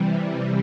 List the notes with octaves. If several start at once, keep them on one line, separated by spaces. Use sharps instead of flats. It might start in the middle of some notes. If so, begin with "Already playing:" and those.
Already playing: C3 E3 G3